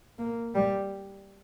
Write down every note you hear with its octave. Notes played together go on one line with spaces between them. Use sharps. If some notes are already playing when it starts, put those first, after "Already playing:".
A#3
G3